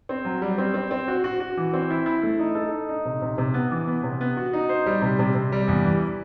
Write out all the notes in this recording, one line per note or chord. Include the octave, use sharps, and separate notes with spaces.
C4
F#3
G3
C4
C4
C4
F#4
F#4
F#4
E3
C4
E4
E4
A3
D#4
A4
D#4
D#4
C3
C3
C3
B3
E3
B3
C3
B3
F#4
D#4
C5
G3
C3
C3
C3
G3
E2
E3